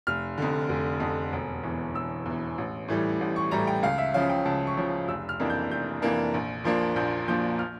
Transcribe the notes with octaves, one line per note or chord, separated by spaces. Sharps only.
F1 F6
F2 D3
F1
F2 D3
E1
E2 E3
E1 E6
E2 E3
A1
A2 E3 G3
A1
C#6
A2 E3 G3 A#5
G5
C#2 F5
E5
C#3 F3 C#4 F5
G5
C#2 A5
C#6
C#3 F3 C#4
F1 E6
F6
F2 E3 A#3 D4
G6
F1 G6
F2 E3 A#3 D4
A#1
A#2 F3 A#3 D4
A#1 G6
A#2 F3 A#3 D4 G6
F6